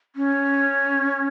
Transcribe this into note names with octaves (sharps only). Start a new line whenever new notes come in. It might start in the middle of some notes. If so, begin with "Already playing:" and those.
C#4